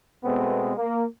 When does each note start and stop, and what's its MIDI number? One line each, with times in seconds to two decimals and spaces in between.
0.24 0.72 47
0.24 0.72 56
0.24 0.72 57
0.24 0.72 59
0.24 0.72 60
0.76 1.03 58